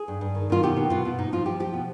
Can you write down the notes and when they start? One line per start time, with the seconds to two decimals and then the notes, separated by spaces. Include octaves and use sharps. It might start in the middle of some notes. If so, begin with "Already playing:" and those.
Already playing: G#4
0.08 G2
0.21 G2
0.35 D#3
0.50 D#3 F4
0.63 B2 G4
0.77 B2
0.90 B2 F4
1.05 B2
1.18 G#2 D#4
1.32 F3 F4
1.46 F3 G4
1.60 F3 G4
1.73 B2